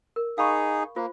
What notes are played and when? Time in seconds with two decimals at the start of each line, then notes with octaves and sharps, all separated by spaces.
0.16 A#4
0.38 D#4 G#4 F5 B5 C#6
0.96 A#3 F4 C5